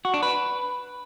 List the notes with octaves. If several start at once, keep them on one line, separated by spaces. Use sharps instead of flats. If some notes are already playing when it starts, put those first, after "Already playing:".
F#4
D4
B4